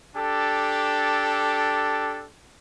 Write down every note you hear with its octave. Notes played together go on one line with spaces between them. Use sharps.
D4 G4 A4